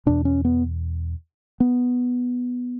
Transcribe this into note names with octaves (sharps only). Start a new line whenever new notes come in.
E2 B2 D4
C#4
B3
B3